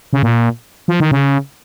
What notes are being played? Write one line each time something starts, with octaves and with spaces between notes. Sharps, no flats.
C#3
A#2
F3
D#3
C#3